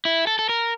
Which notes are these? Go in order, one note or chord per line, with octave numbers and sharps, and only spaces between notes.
E4
A4
A4
A#4